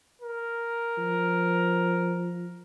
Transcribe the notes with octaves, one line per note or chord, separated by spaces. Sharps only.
A#4
F3